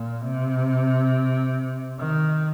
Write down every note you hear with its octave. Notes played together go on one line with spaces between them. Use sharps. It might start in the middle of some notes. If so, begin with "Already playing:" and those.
Already playing: A#2
C3
D#3